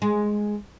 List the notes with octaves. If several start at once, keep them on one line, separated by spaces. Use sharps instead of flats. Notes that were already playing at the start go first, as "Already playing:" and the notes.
G#3